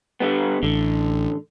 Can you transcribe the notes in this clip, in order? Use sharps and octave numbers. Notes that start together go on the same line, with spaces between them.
D3 G3 B3
A1 D3